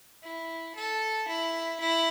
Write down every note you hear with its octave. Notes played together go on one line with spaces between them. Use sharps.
E4
A4
E4
E4